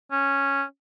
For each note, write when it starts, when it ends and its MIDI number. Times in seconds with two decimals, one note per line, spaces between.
0.12 0.63 61